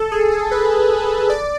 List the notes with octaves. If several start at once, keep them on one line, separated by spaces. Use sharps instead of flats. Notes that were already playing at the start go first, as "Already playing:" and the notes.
Already playing: A4
G#4
G#4
B4
D5